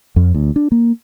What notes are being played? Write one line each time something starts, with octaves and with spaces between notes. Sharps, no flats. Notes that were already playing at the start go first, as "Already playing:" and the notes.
F2
D2
D4
A#3